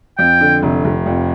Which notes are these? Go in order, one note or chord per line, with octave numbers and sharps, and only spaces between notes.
F2 G5
D3
F1
F1
F2